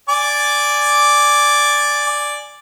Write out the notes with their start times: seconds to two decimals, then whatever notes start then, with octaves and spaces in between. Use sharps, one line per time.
0.09 D5 G#5 D6